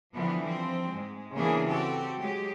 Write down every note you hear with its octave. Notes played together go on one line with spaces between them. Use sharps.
D3 E3 F3 G3 B3
F3 C4
G#2 G#3
C#3 E3 A#3 B3 D4 G#4
C4 F#4 G4 A4
F#3 G#3 G4